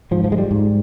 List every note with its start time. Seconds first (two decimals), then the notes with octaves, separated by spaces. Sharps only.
0.11 G#2 F3
0.24 F3
0.32 G#3
0.38 G3
0.51 G#2